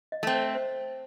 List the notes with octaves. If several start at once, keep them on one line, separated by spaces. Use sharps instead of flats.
D#5
A3 C4
C5
C5